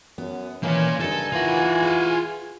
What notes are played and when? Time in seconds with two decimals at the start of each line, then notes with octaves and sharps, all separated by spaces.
0.18 F#2 B3
0.63 D#3 E3 A#3 C#4 B4 D5 G#5
1.00 G2 C#3 D#4 A4 A#4
1.32 E3 F4 F#5
1.82 G#4